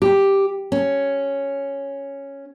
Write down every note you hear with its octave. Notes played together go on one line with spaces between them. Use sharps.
G4
C#4